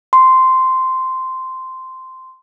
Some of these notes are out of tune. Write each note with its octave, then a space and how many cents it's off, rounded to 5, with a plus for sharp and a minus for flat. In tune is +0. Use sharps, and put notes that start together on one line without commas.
C6 -10